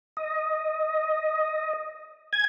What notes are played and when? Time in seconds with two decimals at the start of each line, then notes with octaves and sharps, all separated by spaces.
0.17 D#5
2.33 G#5 G#6